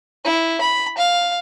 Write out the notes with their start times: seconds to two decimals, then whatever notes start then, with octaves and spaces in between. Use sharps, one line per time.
0.24 E4
0.61 B5
0.98 F5